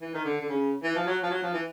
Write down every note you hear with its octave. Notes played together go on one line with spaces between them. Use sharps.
E3
D#3
D3
D3
C#3
E3
F3
F#3
F3
F#3
F3
E3